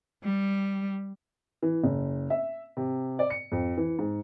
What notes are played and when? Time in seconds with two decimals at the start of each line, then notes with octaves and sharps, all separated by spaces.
0.23 G3
1.62 E3
1.84 F#1
2.30 E5
2.77 C3
3.19 D5
3.30 C#7
3.52 F2
3.77 E3
3.99 G#2